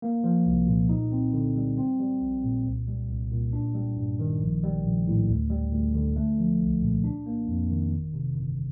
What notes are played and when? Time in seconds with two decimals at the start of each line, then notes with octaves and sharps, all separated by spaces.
0.02 A#3
0.24 F3
0.46 C2
0.67 A#2
0.89 D#4
1.12 C4
1.33 D3
1.56 G3
1.77 C4
1.99 G3
2.21 A#1
2.44 A#2
2.65 C2
2.88 G3
3.09 C2
3.31 A#2
3.53 D4
3.75 G3
3.97 G2
4.19 D#3
4.41 A#1
4.63 G3
4.85 A#1
5.07 A2
5.29 D2
5.50 G3
5.73 D2
5.95 D3
6.16 A3
6.38 F3
6.60 C2
6.82 A#2
7.04 D4
7.26 A#3
7.48 F2
7.70 D#3
7.92 G1
8.14 C3
8.36 G1